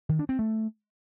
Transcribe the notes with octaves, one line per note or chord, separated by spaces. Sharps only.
D#3
D4
C4
A3